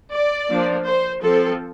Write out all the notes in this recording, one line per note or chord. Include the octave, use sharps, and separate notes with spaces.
D5
F3 A#3 D4
C5
F3 C4 A4